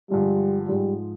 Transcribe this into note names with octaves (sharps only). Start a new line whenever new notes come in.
G2 D3 F3 G3 G#3
G#2 F3 G3 G#3